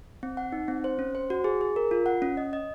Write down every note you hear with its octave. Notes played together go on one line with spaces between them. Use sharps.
C4
F#5
D#4
C4
C5
C#4
C5
F#4
G#4
G#4
A#4
F4
F#5
C#4
D#5
D#5